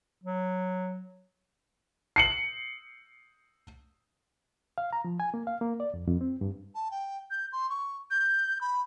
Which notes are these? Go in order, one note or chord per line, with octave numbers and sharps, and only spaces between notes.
F#3
C7 C#7 F#7
F5
A#5
F3
G#5
A#3
F5
A#3
D5
F2
F2
C4
G2
A5
G5
G6
C6
C#6
G6
B5